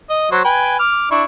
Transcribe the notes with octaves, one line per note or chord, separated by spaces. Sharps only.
D#5
F#3 C5 C#6
B4 G5 G#5
D6 F6
D4 E4 C#6